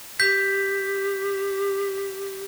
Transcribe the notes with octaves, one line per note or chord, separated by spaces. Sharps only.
G4 G6 B6